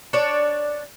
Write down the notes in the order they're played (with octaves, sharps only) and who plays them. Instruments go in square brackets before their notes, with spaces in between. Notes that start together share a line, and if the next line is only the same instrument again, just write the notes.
[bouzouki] D4 C#5 D5